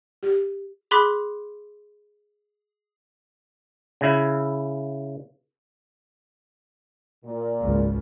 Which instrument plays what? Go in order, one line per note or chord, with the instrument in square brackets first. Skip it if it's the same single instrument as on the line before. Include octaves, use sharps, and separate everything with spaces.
[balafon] G4
[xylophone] G#4 B5 C6 D6 F#6 B6
[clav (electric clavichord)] C#3 E4
[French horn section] A#2
[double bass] G#1 C#2